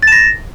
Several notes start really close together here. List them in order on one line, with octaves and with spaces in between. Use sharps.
A6 E7 A#6